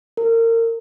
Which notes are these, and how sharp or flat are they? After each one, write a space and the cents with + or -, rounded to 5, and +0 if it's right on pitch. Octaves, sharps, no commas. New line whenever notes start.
A#4 -30